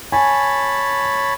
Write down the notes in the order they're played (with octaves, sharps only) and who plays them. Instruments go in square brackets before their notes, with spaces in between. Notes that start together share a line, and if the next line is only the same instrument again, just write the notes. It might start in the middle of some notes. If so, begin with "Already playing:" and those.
[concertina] C#5 A5 B5 [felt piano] G#5